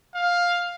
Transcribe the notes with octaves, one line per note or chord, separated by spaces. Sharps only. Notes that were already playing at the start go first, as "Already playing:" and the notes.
F5